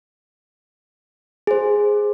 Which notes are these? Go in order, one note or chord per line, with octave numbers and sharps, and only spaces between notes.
G#4 C5